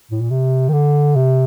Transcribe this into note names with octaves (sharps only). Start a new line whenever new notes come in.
A2
A#2
C3
D#3
D3
C3